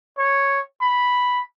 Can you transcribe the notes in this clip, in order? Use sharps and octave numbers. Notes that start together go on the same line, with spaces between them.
C#5
B5